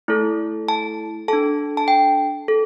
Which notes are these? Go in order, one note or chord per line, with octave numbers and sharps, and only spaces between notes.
A3 E4 A4
A5
D4 A4 A5
A5
G5
A4